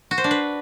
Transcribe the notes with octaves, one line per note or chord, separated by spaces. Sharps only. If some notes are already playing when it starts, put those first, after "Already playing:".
F#4
C5
D4
B4